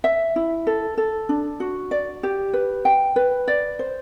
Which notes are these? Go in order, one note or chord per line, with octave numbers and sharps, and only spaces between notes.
E5
E4
A4
A4
D4
F#4
D5
G4
B4
G5
B4
D5
C5